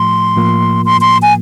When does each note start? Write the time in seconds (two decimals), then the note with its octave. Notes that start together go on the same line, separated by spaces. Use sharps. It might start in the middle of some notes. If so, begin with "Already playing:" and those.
Already playing: A2 F3 A3 C6
0.37 A2 F3 A#3
0.85 C6
1.01 C6
1.22 G#5